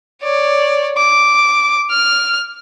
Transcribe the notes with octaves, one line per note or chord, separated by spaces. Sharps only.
C#5 D5
D6
F6